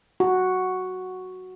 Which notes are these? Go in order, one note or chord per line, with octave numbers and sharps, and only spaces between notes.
F#4